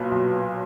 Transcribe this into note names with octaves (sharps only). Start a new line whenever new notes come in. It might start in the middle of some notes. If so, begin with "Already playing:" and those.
Already playing: B1 A#2 F#3 B4
B1